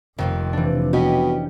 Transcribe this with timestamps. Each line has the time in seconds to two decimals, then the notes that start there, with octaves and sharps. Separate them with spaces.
0.18 F1 F2 C3 D#3 A#3 C4
0.53 E3 D4
0.93 B2 C#4 G4 D#5